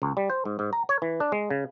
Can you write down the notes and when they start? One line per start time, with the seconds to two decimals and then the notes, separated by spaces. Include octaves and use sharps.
0.02 C#2
0.17 G3
0.30 C5
0.45 G#2
0.59 G#2
0.73 A#5
0.89 C#5
1.02 E3
1.20 D4
1.32 G#3
1.50 C#3